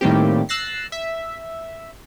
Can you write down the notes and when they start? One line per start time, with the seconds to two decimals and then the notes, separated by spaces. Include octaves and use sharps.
0.01 A2 D#3 G3 A#3 C4 G4
0.49 E6 F#6 A6 A#6 C7
0.92 E5